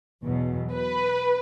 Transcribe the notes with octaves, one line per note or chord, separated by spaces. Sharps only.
E2 B2 F#3
B4